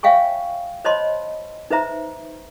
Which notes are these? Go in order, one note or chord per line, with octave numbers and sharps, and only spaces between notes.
C#5 E5 F5 G5 G#5 C#6
C5 C#5 D#5 A5 B5 C6
D#4 B4 C5 E5 A#5